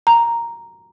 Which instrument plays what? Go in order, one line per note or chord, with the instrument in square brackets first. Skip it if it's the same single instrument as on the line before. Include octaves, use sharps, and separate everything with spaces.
[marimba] A#5